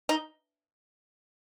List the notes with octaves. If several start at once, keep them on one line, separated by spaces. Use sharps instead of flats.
D#4